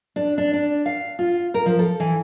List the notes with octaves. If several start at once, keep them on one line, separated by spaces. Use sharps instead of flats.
D4
D4
D4
F5
F4
A#4
F3
A4
E3